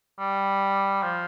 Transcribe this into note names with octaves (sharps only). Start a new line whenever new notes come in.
G3
F3